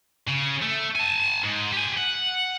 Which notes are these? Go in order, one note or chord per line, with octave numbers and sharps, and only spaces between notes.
C#3
A3
G#5 A5
G#2
G4 G#5
F#5